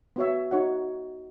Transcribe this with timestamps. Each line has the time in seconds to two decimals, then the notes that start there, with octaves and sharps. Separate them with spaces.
0.16 B3 F#4 C#5 E5
0.51 D#4 F#4 C#5 F#5